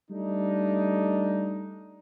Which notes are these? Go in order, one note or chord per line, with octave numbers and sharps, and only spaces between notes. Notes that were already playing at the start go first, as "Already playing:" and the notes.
G3 A3 D4 D#4